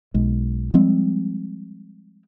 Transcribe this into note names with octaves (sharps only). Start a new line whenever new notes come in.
B1 G#3
F3 G3 G#3 C4